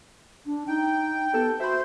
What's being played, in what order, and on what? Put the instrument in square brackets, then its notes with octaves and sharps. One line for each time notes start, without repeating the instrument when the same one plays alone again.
[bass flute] D4
[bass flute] D#4 [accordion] G5
[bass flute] B3 [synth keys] G4 A4 A5
[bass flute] F#4 [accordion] C5 [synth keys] E5 B5